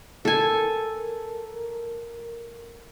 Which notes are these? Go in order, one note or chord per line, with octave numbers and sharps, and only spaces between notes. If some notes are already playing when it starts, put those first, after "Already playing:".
A4 A#4 G#5